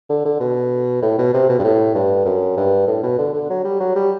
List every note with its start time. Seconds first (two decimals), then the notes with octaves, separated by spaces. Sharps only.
0.10 D3
0.25 D3
0.40 B2
1.02 A2
1.18 B2
1.34 C3
1.49 B2
1.59 G2
1.64 A2
1.94 G2
2.25 F#2
2.57 G2
2.87 A2
3.03 B2
3.18 D3
3.33 D3
3.50 F#3
3.64 G3
3.80 F#3
3.96 G3